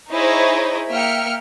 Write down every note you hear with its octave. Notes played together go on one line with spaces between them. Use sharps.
D#4 E4 G#4 C5 C#5 D#5
A#3 E5 G5 F6 C#7